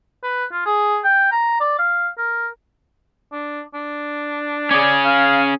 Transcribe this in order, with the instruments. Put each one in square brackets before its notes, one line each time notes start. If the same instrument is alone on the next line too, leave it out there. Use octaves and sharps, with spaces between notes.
[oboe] B4
F4
G#4
G5
A#5
D5
F5
A#4
[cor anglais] D4
D4
[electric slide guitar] C#4 G#4 [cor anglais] D5
[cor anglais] F5